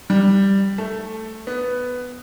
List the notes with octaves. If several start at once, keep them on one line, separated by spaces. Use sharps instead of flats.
G3
A3
B3